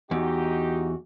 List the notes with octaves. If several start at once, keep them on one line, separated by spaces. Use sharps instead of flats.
E2 D#4 F#4 G4